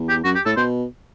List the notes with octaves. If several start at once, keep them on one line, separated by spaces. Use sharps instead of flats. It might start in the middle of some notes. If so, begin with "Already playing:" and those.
Already playing: E2
G4
F#2 F#4
G4
A2 A4
B2 C5